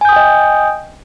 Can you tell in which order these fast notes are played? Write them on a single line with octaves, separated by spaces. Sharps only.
G#5 G6 D#6 G5 D#5